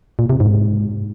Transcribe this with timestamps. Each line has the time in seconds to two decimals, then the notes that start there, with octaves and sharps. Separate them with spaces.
0.19 A#2
0.30 C3
0.40 G#2